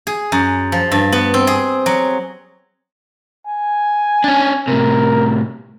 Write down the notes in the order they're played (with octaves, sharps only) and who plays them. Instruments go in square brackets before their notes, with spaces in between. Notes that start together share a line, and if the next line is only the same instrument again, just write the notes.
[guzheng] G#4
F#2
F3
G2
B3
C4
G#4
F#3
[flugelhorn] G#5
[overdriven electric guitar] C#4 D4
[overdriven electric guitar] A2 C3 [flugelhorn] A#4